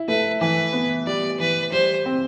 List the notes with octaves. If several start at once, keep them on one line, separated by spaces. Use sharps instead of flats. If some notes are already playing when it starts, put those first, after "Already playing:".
Already playing: E4
A3 B4
E3 B4
B3
G3 D5
E3 B4
G3 C5
C4